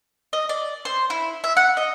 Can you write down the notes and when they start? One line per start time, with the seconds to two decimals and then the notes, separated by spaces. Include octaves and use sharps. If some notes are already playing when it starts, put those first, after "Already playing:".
0.33 D#5
0.49 D5
0.85 C5
1.10 E4
1.44 E5
1.57 F#5
1.77 D#5